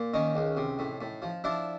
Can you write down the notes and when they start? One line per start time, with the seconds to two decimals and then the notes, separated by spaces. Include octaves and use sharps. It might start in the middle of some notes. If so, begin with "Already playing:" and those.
Already playing: A#2
0.14 D#3 C#4 D#4
0.35 C#2
0.57 C3
0.79 A2
1.01 A2
1.22 F3
1.44 F3 D4 E4